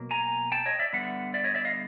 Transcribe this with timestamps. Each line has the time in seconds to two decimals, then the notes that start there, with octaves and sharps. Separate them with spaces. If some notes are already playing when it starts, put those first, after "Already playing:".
Already playing: B2 F#3 A#3
0.11 G#5 A#5
0.52 G5 A5
0.66 C#5 D#5
0.79 D5 E5
0.93 D3 G3 B3 E5 F#5
1.34 D5 E5
1.44 C#5 D#5
1.55 D5 E5
1.65 D#5 F5